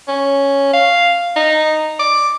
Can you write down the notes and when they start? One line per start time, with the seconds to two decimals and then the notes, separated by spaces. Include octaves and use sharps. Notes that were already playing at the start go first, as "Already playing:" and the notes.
0.08 C#4
0.74 F5
1.36 D#4
1.99 D6